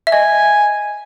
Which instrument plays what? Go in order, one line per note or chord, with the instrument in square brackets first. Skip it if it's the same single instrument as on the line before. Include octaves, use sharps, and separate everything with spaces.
[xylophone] E5
[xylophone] D#5 [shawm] G#5